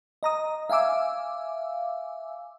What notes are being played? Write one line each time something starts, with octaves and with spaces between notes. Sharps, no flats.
D#5 A#5 D#6
E5 F5 G#5 D6 E6